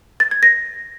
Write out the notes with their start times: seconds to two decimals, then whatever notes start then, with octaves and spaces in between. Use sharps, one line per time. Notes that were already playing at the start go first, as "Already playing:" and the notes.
0.20 A6
0.31 G#6
0.43 A#6